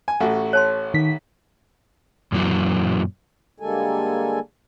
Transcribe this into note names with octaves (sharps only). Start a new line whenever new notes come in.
G#5
A1 A3 F#4
C#5 A5 C6
D#3 B6
F#2 A#2 E3 F#3
D3 G3 G#3 A#3 A4 G#5